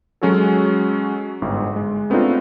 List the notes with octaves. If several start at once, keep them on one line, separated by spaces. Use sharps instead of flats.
F#3 G#3 C#4 F#4 G#4 A4
G1 G#2
G#3
A3 B3 C4 D4 D#4 F4